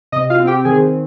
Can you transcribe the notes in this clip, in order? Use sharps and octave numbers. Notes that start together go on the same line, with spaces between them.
C3 D#5
F4 F5
C4
G4 G5
D#3 G#4 G#5